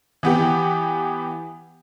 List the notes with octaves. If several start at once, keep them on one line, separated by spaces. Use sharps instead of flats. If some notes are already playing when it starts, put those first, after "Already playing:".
E3 B3 G4